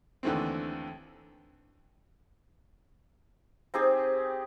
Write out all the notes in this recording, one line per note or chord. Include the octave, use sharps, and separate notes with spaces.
D#2 D3 E3 A3 C4
C4 D#4 G4 G#4